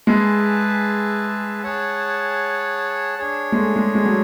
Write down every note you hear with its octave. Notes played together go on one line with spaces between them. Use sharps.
G#3 G#4 B4 E5 A5
G#4 C#5 F#5 A5
D4 G#4 C#5
G#3
A3
G#3
G#3
F#3